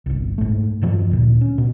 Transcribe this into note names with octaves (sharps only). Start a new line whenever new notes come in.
G1 C2
G#2 A3
E2 G2 F3
D2 A#2
C#4
B2